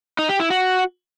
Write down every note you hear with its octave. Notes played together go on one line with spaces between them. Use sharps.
D#4
G4
E4
F#4